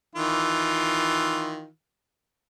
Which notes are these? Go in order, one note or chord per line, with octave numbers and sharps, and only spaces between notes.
D#3 E3 F4